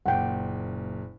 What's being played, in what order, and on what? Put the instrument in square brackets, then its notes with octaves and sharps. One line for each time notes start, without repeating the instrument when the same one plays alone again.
[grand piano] F#1 A#2 [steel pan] F#5 G5